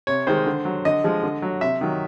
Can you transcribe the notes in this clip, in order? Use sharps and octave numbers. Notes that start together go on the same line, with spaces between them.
C3 C#5
D#3 G#3 C5
D3
F#3
D3 D#5
F3 G#3
D3
F#3
C3 E5
D#3 F#3